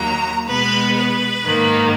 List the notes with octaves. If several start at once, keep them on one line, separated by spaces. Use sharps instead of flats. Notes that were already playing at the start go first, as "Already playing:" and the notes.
Already playing: D#2 D#3 F#3 A#3 A#5
B2 G#3 B3 B4
B4
G#2 D#3 A#3